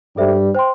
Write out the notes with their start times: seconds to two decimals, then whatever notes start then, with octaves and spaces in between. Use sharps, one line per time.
0.17 G2 G3 A4 C5 E5
0.55 C5 G5 C6